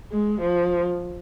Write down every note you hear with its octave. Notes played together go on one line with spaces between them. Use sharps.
G#3
F3